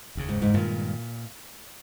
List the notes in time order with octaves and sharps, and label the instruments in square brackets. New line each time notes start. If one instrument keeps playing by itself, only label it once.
[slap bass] F1 D#2 C#3
[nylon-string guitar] G#2
G#2
[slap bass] G2 D#3 G#3 [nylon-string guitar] A#2